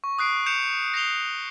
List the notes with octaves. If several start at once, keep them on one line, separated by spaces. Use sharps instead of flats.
C#6
D#6 F#6 C7 D7
G6 C#7 D7 E7 F7
A#6 C7 F7 G7